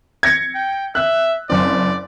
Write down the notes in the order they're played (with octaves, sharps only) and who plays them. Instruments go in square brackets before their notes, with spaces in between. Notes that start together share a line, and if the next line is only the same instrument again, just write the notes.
[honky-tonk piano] G#6 A#6 C#7
[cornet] G5
[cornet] E5 [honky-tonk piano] F#6
[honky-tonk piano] F#1 C4 [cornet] D5